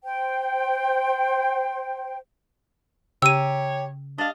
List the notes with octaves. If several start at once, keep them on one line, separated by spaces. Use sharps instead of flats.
C5 G5
C#3 G4 C#5 A#5 E6 D#7
D4 D#5 F5